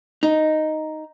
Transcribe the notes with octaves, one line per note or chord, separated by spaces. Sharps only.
D#4